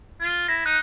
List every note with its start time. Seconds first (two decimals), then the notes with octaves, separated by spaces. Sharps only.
0.21 F4
0.48 E4 A#6
0.66 D#4 F#6